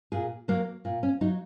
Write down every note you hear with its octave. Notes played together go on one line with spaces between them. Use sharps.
A#2 G#4
F#3 A#3
A#2
C#4
F#3 D#4